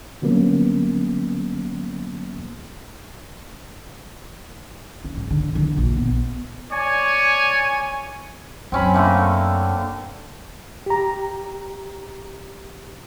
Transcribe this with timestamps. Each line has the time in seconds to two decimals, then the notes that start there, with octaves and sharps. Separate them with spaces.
0.22 D3 F#3 G3 A#3 B3 C#4
5.04 C#4
5.17 G#2
5.30 D3
5.55 D3
5.77 A#1
5.97 B3
6.71 C#5 D5 G#5
8.72 F#2 C4 C#4 B5
8.94 D3 A3 A#3
10.86 G4 A#5